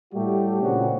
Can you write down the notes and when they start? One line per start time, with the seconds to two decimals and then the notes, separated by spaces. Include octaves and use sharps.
0.13 A2 G3 A3 F#4 G4
0.62 A#2 C#3 C4 D4 F#4